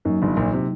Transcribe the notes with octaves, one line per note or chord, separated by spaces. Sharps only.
F#2 F#3 A#3 D#4
G1 G2
A#1 A#2
C3